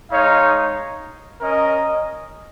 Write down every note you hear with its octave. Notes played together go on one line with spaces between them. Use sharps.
G#3 D#4 C#5 F5
C#4 A#4 D#5